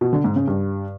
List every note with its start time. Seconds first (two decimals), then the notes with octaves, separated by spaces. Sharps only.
0.01 B2
0.13 D3
0.24 G#2
0.36 C#3
0.48 G2